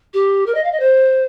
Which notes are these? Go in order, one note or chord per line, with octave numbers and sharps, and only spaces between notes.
G4
A#4
D#5
F5
D#5
C5